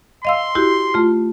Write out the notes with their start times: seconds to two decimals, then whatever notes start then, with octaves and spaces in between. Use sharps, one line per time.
0.25 D#5 F5 C6 E6
0.55 E4 F#4 G4
0.94 A3 F4